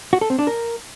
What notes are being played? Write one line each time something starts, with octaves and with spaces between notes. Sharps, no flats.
F#4
A4
C4
D4
A#4